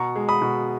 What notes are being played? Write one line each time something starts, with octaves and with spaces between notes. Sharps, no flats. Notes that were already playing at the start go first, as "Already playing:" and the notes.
Already playing: B2 A#5 C#6
G#3
B5 D#6
B2